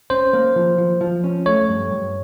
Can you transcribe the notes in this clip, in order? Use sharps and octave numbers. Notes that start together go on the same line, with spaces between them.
C#4 C5
A#3
F3
F3
F3
C#4
A3 C#5
G2
G2